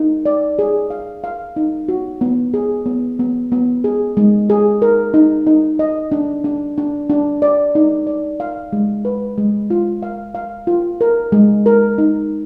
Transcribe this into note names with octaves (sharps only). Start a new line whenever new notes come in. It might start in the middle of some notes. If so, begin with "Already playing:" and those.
Already playing: D#4
D5
G#4
F5
F5
D#4
F#4
B3
G#4
B3
B3
B3
G#4
G#3
G#4
A#4
D#4
D#4
D#5
D4
D4
D4
D4
D5
D#4
D5
F5
G#3
B4
G#3
F4
F5
F5
F4
A#4
G#3
A#4
D#4